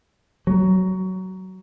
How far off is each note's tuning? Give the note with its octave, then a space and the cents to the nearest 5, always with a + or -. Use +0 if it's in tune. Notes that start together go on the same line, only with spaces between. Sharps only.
F#3 +15